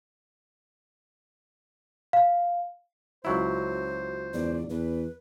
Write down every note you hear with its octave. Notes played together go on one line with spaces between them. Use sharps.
F5
C#2 F#3 E4 F#4 C5
E2 D5
E2 B4